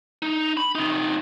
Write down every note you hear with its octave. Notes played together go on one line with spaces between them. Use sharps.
D#4
B5
C3 D#4